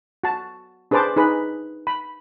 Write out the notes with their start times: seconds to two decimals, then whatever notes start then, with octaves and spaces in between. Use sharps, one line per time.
0.24 F#4 A5
0.91 D4 G#4 B4 C5 A5 D6
1.16 D#4 G#4 B4 B5
1.87 B5